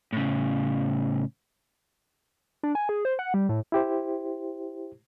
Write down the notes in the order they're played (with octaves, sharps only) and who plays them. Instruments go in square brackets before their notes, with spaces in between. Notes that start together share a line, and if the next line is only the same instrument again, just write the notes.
[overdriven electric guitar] A2 C#3
[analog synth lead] D4
G#5
G#4
C5
F#5
G3
A2
[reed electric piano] E4 G4 C5